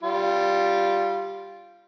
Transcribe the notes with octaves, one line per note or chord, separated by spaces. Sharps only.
G3 F4